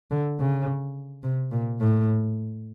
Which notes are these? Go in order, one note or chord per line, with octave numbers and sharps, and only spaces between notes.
D3
C#3
C3
A#2
A2